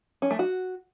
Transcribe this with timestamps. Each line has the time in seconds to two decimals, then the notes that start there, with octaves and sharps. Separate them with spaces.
0.22 C#4
0.31 A3
0.39 F#4